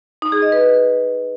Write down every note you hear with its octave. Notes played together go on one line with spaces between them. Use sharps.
D#4
G#4
D#5
B4